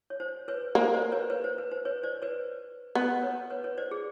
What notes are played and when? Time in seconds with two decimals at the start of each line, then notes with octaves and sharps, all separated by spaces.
0.10 C#5
0.20 C5
0.48 B4 C#5
0.75 A#3 C5
0.94 C5 D5
1.12 B4 C#5
1.30 B4 C#5
1.44 C5
1.58 B4
1.71 C5
1.85 B4 C#5
2.03 C5 D5
2.22 B4 C#5
2.95 B3
3.22 B4 C#5
3.50 B4 C#5
3.64 B4 C#5
3.78 C5 D5
3.91 G#4